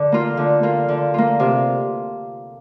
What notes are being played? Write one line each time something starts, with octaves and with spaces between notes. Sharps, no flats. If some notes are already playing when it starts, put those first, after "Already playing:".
Already playing: D3
A#3 F4
D3
A#3 F4
D3
A#3 F4
C3